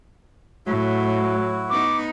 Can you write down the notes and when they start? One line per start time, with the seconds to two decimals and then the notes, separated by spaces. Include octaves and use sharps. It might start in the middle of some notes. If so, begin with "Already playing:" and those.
0.67 A2 F#3 E4 F#4
1.70 B3 D#4 D6